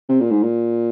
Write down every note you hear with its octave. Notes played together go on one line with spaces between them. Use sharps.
C3
A#2
G#2
A#2